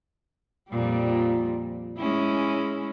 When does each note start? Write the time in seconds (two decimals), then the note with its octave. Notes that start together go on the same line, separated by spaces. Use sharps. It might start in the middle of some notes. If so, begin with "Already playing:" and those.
0.69 F2 A#2 G3
1.97 G#3 C#4 E4